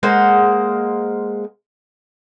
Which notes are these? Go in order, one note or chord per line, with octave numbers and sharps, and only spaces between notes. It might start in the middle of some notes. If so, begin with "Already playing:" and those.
G#3 A#3 C5 F#5